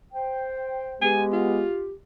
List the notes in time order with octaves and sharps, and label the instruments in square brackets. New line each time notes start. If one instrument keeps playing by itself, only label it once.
[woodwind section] C5 G5
[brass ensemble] G#3 B3 [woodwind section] G4 [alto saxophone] G#5
[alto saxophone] F4